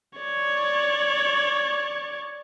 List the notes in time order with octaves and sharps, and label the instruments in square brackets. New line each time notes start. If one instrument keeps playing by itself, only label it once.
[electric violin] C#5 D5